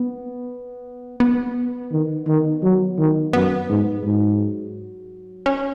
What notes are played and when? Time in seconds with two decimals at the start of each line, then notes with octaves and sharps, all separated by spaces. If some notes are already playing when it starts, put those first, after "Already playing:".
Already playing: B3
1.20 B3
1.92 D#3
2.27 D#3
2.63 F#3
2.98 D#3
3.33 F#2 B3
3.69 G#2
4.04 G#2 F#3
5.46 C#4